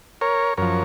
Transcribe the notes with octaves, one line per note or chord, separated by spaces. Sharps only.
A#4 C#5
F#2 F3 A#4 C#5